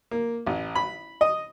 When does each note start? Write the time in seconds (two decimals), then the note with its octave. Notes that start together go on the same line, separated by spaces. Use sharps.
0.11 A#3
0.46 A1
0.75 B5
1.21 D#5